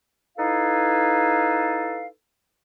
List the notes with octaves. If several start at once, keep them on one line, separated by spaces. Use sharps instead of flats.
D#4 E4 A4 B4 F5